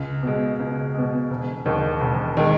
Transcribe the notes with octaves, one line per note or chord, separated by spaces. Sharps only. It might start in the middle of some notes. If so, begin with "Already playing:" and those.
Already playing: C#2
B2 G#3
C#2
B2 G#3
E1
D#2 D#3 G#3
E1
D#3 G#3